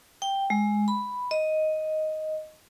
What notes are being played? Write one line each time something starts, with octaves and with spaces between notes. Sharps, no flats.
G5
G#3
B5
D#5